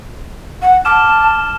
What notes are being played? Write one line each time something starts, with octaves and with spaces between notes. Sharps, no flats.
F#5
A5 D6 F6 E7